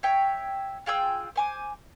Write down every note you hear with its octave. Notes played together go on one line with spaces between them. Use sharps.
C#5 E5 G5
F4 G#4 G5 E6
C5 G#5 D6